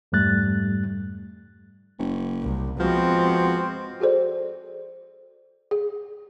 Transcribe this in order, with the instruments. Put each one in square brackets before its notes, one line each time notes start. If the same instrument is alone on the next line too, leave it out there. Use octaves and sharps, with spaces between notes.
[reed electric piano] F2 G#2 G3 A3 F#6 A6
[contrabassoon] F#1
[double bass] C2
[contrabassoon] F3 [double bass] G#3 C4 [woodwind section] B3 F#4
[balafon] F#4 G#4 A4 C5 D5
G#4